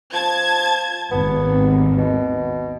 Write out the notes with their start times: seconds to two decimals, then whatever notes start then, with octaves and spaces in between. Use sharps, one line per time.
0.13 F3 A5 G#6
1.11 G#1 D#2 B3
1.98 B2